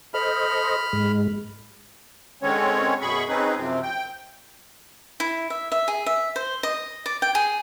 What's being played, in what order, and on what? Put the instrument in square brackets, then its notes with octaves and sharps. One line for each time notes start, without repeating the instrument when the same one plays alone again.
[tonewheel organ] A4 C5 D#5 [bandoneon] B5 F6
[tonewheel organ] G#2 G#3
[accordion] D3 D#3 G#3 C4 C#4 C#5
F#2 B2 G#4 B5 C#6
C4 C#4 D#4 G#4 B4
F#2 C3 F3 C4
G5
[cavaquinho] E4
E5
E5
G#4
E5
C5
D#5
D5
G5
G#4